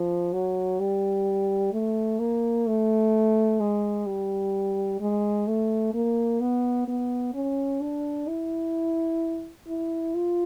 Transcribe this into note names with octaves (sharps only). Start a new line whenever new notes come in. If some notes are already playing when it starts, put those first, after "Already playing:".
Already playing: F3
F#3
G3
A3
A#3
A3
G#3
G3
G#3
A3
A#3
B3
B3
C#4
D4
E4
E4
F4